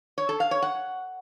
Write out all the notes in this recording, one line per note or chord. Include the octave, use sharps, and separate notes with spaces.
C#5
A4
F5
C#5
F#5